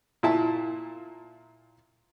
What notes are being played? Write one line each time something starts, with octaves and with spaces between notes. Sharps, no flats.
A#2 E4 A5